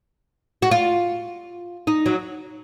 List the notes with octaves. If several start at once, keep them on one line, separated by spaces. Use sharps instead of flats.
F#4
F4
D#4
F#3